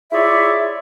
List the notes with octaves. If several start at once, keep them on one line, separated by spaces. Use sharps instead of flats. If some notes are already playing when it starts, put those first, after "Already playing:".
E4 F4 G#4 C#5 D5 E5